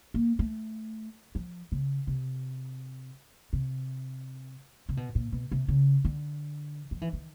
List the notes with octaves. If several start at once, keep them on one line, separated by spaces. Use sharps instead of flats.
A#3
A3
F3
C#3
C3
C3
C3
B2
A#2
B2
C3
C#3
D3
F3
E3
D#3